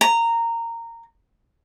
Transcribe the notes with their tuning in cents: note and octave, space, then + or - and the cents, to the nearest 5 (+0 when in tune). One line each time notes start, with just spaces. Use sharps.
A#5 -15